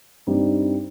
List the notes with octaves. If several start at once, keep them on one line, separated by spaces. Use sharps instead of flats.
G2 G3 C4 D#4